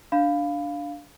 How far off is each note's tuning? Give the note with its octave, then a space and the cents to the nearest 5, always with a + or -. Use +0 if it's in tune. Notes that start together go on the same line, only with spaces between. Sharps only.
D4 +0 F5 +0 B5 +15